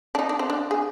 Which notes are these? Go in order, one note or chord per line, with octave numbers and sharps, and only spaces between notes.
D4
D#4
D4
C4
D4
G#4